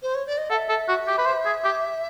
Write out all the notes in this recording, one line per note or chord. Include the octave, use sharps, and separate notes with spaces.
C5
C#5
D5
D#5
A4 F#5
E5
A4
F#4
G4
B4
C5
G#4
G4